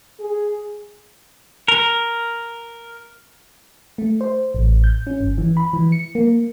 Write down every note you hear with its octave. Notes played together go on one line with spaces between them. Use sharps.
G#4
A#4
A3
C5
A1
G6
C#4
G1
E3
B5
E3
C#7
A#3